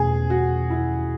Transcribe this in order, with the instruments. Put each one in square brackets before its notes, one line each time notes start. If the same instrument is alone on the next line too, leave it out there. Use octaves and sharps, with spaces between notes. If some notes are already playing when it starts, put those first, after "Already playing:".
Already playing: [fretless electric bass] E2 B2 A3 C#4 [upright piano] G#4
[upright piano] F#4
E4